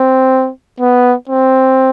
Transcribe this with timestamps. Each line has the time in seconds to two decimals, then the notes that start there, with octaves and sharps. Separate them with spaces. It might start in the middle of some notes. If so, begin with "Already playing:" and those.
Already playing: C4
0.81 B3
1.29 C4